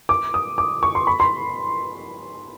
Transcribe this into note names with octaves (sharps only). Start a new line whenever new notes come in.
D6
D#6
D6
C#6
C6
B5
C6